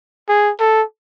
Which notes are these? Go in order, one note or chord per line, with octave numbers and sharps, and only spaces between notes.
G#4
A4